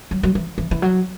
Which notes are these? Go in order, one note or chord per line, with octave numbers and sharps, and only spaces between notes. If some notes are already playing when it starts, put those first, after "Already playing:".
F#3
F#3
E3
E3
E3
F#3